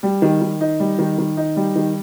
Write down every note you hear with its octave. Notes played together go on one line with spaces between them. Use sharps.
G3
D#3
D#3
D#4
G3
D#3
D#3
D#4
G3
D#3